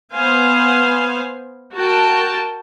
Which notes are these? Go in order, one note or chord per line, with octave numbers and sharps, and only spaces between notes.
B3 C5 F5 G#5
F#4 A#4 G5 A5